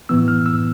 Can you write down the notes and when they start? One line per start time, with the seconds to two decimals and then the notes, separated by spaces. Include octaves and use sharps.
0.09 A2 E3 B3 E6
0.28 F6
0.46 E6